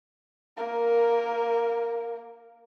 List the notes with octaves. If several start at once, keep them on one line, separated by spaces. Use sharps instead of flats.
A#3 A#4